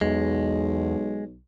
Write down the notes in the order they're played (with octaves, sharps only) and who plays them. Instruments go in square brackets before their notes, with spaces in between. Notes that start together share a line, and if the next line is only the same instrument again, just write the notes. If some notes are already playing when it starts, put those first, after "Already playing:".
[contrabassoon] B1 [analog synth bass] E2 [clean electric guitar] G#3